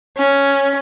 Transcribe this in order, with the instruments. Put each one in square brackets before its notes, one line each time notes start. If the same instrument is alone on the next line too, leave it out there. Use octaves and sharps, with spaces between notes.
[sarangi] C#4